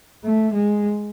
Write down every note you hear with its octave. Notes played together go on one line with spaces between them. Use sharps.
A3
G#3